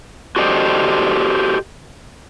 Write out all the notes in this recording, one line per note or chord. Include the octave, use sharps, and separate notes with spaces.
F#4 G4 A4 C5 D5 D#5